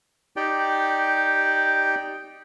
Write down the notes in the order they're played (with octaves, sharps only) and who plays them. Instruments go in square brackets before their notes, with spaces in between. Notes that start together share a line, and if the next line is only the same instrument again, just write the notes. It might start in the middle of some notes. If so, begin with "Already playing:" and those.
[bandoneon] D#4 G4 D5 G5